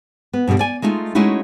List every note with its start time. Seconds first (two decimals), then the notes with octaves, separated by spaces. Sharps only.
0.33 B3
0.47 G2 B2 D3 G3 D4
0.59 D5 G#5
0.82 G#3 A3 D#4 F4
1.15 G#3 A3 C#4 D#4 E4 F#4